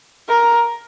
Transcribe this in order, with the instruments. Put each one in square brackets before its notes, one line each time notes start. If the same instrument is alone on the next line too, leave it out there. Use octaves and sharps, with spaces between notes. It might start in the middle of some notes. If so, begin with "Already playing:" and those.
[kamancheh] A#4